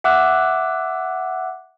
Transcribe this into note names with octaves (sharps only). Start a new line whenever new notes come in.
E5 F#5 D6 E6 F#6